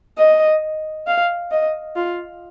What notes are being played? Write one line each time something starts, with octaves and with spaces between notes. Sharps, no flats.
D#5
F5
D#5
F4